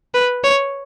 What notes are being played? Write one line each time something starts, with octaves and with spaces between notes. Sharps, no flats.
B4
C#5